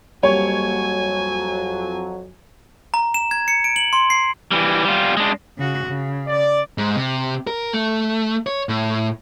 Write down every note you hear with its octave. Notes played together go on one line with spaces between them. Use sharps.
F2 F#3 G3 A#3 G4 C#5 G#5
A#5
E7
G#6
C#7
D7
F#7
C6
C7
E3 G3
G3 F4
G#3 D4
C#3 F#4
C#3
D5
G#2
C3
A#4
A3
C#5
A2